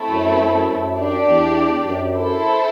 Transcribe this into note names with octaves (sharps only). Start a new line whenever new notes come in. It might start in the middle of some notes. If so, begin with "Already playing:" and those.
Already playing: A3 C4 E4 A4 E5
F#2
F#2
F#2
D4 G4 D5
E2
F#2
E4 A4 C5